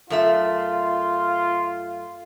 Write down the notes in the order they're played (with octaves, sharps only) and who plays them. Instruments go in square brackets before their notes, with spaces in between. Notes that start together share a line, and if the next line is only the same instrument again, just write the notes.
[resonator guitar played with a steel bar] F#2 A3 E5 [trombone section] F4